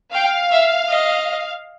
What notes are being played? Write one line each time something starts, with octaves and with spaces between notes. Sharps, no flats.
F5 G5
E5
D#5